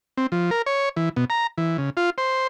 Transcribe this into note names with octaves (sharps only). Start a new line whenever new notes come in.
C4
F3
A#4
C#5
E3
B2
A#5
E3
C#3
F4
C5